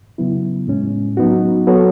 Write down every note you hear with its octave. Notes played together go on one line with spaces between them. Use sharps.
C#3 F#3 B3 E4
A2 G#3 C#4
F#3 B3 D#4 F#4
F#3 B3 F#4 A4 C#5